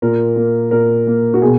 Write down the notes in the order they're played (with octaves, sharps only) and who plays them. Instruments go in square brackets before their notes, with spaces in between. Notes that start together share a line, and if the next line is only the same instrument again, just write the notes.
[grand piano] A#2 A#4
A#3
A#2 A#4
A#3
F#4
B2 G#4